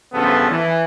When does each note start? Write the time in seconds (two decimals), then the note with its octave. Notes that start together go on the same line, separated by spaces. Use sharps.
0.13 A1 G2 C#3 F3 B3 A4
0.50 E3